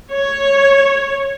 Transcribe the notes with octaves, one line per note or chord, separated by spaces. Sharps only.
C#5